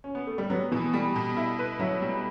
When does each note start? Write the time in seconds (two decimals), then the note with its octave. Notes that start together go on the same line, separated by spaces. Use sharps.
0.04 C#4
0.15 B3
0.27 A3
0.38 G3
0.50 F#3 B3
0.72 B2 E3
0.93 G3
1.15 B2
1.37 E4
1.59 B4
1.79 F#3 E4
2.02 G3